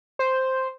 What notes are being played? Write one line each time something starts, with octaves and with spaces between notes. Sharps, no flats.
C5